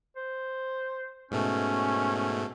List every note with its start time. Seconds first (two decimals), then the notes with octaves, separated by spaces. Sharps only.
0.16 C5
1.31 G#2 B2 A3 C#4